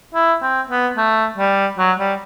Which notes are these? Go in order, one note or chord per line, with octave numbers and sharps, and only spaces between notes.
E4
C4
B3
A3
G3
F#3
G3